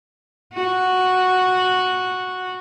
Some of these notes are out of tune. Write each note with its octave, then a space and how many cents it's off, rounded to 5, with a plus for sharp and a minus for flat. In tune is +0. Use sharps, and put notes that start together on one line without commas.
F#4 -5